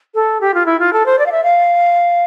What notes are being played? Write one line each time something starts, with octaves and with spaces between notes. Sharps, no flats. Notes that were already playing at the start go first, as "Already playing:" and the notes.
A4
G4
F4
E4
F4
A4
C5
D5
F5
E5
F5